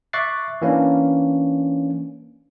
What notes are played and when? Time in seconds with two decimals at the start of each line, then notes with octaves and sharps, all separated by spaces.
0.13 E5 C#6 D6 F#6 A6 C7
0.62 E3 A#3 C#4 D4